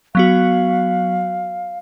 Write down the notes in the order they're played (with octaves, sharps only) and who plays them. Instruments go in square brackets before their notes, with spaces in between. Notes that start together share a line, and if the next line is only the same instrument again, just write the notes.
[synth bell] F#3 B3 F#4 [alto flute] F5